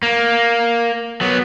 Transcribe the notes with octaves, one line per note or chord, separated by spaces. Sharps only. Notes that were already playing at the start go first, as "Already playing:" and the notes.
A#3
F#3 B3